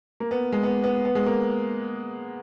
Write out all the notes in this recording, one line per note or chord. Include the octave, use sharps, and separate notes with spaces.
A#3
B3
G#3
B3
B3
B3
G#3
A#3